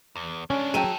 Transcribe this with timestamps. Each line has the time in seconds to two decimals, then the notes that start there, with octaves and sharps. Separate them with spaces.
0.16 E2
0.50 G#3 C#4 D4
0.74 D#3 F#3 G#4 A4 E5 G5 D#7